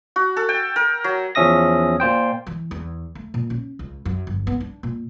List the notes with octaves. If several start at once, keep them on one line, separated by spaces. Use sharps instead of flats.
F#4
A4
G5
A#4
F#3
E2 F3 C#4 E5 D#6 A#6
A#2 F4 C5 G5
E3
E2
A3
A#2
C#4
C#2
F#2
G1
B3
D4
A#2